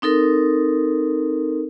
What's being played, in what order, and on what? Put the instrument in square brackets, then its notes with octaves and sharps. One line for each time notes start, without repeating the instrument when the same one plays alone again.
[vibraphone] C4 D#4 A4 A#4